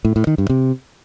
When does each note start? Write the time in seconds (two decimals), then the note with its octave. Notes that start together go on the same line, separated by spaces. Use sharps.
0.05 A2
0.16 A2
0.27 D#3
0.38 G2
0.50 C3